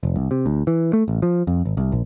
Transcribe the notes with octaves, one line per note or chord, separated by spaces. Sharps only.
F1
C2
C3
D2
E3
A3
A1
F3
F2
G#1
C2
A#1